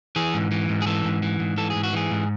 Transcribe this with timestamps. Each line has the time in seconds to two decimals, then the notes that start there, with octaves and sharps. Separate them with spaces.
0.16 E3 G#4
0.34 G#2
0.51 E3
0.69 G#2
0.82 G#4
0.87 E3 A4
1.05 G#2
1.23 E3
1.40 G#2
1.58 E3 A4
1.70 G#4
1.75 G#2
1.83 F#4
1.93 E3 G#4
2.11 G#2